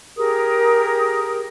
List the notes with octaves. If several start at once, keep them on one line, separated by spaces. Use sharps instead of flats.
G4 G#4 A#4 D#6